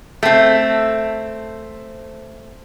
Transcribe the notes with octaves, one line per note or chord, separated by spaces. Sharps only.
A3 C4